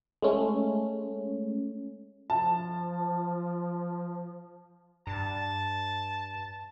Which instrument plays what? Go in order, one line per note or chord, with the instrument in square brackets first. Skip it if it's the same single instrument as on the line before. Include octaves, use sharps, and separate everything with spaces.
[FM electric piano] G#3 A3 C#4
[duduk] F3 [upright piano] A5
[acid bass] G2 [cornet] A5